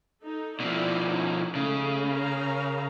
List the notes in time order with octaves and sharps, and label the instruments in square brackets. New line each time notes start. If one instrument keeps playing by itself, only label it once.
[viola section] D#4 A4
[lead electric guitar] B2 F3 [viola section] D4 E4 D5
[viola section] C#4 D#4 E4
[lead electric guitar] C#3 [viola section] G#3 A3
[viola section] A#4 F5 A#5